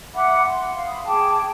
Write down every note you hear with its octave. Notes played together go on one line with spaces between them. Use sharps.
E5 F#5 B5 D6
C6
F5
B5 D#6
G#4 G5 A5 D6